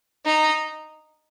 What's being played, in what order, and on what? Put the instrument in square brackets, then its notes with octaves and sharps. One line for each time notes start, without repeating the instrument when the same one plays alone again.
[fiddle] D#4